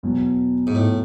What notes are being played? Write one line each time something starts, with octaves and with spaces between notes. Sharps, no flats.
E2 B2 F#3
G#2
A2